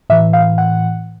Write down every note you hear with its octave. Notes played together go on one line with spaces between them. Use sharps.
A2 E3 E5
F5
F#5